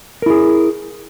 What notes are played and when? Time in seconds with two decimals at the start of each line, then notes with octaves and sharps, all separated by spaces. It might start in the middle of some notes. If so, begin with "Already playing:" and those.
0.22 A#4
0.26 E4
0.30 G#4